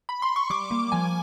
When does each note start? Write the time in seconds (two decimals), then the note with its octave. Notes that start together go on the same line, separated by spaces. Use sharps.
0.09 B5
0.22 C6
0.36 C#6
0.50 G3 D6
0.71 A#3
0.92 F3 G#5